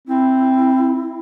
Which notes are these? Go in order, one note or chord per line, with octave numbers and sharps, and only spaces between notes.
C4 E4